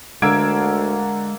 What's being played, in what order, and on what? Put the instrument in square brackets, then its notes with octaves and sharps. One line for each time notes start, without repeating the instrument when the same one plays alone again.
[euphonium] D2 [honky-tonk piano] D3 G#6 D7 [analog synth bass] G#3 [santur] A#3 F5 E6